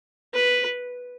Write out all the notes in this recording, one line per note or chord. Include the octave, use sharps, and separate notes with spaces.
B4